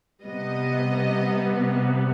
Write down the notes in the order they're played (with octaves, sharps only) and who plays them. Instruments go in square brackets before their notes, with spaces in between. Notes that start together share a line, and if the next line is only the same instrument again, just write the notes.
[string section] C3 G3 B3 D#5